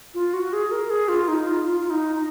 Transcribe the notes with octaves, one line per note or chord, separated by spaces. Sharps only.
F4
F#4
G#4
A#4
G#4
F4
D#4
F4
F4
F4
D#4
D#4